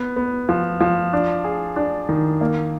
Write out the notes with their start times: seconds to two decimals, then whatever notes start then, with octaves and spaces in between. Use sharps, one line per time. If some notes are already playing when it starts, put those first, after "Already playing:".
Already playing: B3
0.16 B3
0.49 F3
0.81 F3
1.13 D4
1.44 G#4
1.76 D4
2.09 D#3
2.41 A#3